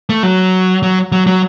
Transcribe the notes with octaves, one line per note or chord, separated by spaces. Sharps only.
A3
F#3
F#3
F#3
F#3